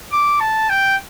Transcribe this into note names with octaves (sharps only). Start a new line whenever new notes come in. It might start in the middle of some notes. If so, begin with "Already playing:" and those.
D6
A5
G5